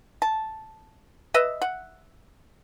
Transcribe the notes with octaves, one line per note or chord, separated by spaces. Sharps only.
A5
B4 D#5 E5
F#5